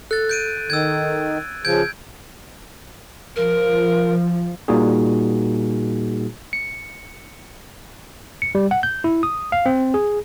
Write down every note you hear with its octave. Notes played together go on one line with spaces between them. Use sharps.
A4 F#6 A6
G6 D7 D#7
D#3 E6 G#6
C#3 F3 G6 G#6 D7
F3 A#4
A#2 G3 A#3 D#4 F#4 G#4
C#7
C#7
G3
F#5
G6
E4
D#6
F5
C4
G#4